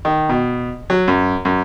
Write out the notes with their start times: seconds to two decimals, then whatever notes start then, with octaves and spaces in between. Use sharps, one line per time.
0.05 D#3
0.29 B2
0.90 F#3
1.08 F#2
1.45 F#2